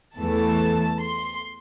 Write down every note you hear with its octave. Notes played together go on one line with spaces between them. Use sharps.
E2 E3 A3 A5
C6